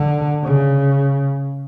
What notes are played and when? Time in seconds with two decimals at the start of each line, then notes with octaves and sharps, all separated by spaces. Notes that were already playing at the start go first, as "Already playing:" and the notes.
Already playing: D3
0.43 C#3